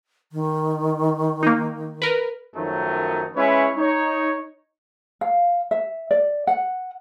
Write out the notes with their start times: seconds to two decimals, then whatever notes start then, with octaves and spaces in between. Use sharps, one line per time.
0.32 D#3
1.43 A#3 D#4
2.02 A#4 B4
2.55 F#2 D#3 F3 F#3 A3 D#4
3.36 G#3 C#4 E4 B4 C#5
3.77 D#4 C#5
5.21 F5
5.71 E5
6.11 D5
6.47 F#5